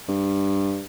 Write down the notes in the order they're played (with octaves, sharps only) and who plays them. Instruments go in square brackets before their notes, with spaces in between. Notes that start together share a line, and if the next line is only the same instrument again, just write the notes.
[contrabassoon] G2